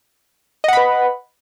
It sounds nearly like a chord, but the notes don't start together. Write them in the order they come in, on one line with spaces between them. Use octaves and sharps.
D#5 F#5 B5 B4